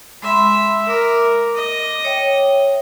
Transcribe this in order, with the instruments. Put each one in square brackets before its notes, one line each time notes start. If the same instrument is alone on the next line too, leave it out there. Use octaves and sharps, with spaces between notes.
[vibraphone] G#3 B5 C6 [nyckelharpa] E5
[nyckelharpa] A#4 [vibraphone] D6
[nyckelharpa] D#5
[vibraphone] C#5 E5 G5